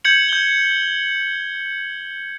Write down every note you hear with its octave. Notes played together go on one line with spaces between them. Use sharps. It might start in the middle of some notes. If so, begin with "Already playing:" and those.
G6 G#6 C#7 F#7
G6 G7